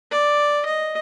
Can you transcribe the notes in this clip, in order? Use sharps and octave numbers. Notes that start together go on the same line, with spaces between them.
D5
D#5